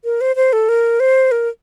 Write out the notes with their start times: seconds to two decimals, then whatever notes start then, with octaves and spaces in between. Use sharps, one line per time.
0.05 A#4
0.21 C5
0.36 C5
0.53 A4
0.69 A#4
1.00 C5
1.31 A#4